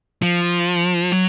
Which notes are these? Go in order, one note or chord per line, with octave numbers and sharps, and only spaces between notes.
F3
F#3